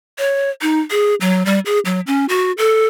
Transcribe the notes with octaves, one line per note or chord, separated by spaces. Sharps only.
C#5
D#4
G#4
F#3
G3
G#4
F#3
C#4
F#4
A4